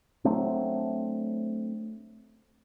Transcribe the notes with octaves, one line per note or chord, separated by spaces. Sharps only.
F#3 A3 C4 D4